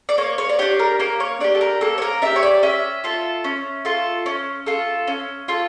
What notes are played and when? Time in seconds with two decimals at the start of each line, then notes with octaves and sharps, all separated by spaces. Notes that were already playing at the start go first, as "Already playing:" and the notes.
0.09 D5
0.18 A#3 C#5
0.38 C#5
0.49 D5
0.59 D4 G4 C#5
0.79 A#4
1.00 A#3 A#4
1.20 C#5
1.40 D4 G4 D5
1.55 A4
1.61 A#4
1.81 A#3 A4
1.98 C#5
2.02 A#4
2.22 D4 G4 E5
2.36 C#5
2.43 D5
2.63 C#4 E5
3.04 F4 A4
3.44 C#4
3.85 F4 A4
4.26 C#4
4.66 F4 A4
5.07 C#4
5.48 F4 A4